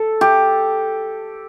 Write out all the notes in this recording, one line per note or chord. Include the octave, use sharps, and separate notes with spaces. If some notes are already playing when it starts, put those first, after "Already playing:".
Already playing: A4
G4